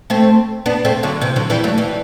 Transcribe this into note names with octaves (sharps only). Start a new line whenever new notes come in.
A3 C4
B3 D4
A3 C4
D3 F#3
C3 E3
D3 F#3
E3 G3
F#3 A3
E3 G3